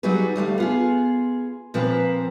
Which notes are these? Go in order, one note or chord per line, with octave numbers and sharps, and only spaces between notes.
F#3 G3 D#4 F#4 G#4 B4
D2 G3 A3 F5
B3 F4 G#4
A#2 F3 A#3 C4 B4 F5